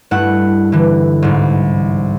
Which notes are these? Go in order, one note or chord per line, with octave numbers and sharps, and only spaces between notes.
G2 A3 E4 F#5
D3 E3
C2 G#2